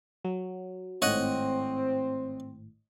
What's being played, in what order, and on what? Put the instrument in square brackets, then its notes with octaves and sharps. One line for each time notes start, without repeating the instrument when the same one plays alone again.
[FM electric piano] F#3
[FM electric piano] G#1 A2 [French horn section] C4 [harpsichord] C#5 D#5 F#5